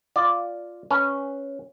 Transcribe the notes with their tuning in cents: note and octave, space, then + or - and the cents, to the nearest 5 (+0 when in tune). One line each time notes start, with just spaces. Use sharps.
F4 +0 D5 +0
C#4 +0 B4 +0